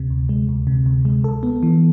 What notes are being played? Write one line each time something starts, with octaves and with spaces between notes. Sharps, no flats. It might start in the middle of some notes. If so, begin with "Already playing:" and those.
Already playing: D2 C3
D2
G#3
D2
C3
D2
G#3
A4
B3
E3